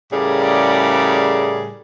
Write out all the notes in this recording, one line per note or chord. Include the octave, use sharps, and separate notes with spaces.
A2 C#3 G3 G#4 A#4 D5